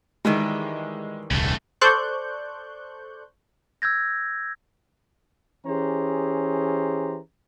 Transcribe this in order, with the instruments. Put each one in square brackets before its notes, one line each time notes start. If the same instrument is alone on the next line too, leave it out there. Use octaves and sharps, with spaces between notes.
[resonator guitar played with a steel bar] D#3 E3 G3 [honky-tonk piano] G#3
[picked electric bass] D#1 C2 [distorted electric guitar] C#3 A3
[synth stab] A4 C5 D5 C#6 F#6 G6
[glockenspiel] E6 G6 G#6 A#6
[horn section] E3 C#4 G4 G#4 C5 A#5